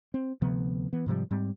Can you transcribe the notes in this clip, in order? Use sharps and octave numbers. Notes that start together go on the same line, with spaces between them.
C4
D2 C3 F3 B3
E3 B3
G#2 C3 F3 G3
G#2 G3 C4